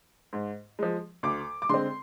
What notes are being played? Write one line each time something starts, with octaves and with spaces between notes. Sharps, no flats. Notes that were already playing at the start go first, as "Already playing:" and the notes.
G#2
F3 G#3
D2 D6
D6
D3 G#3 C4 C6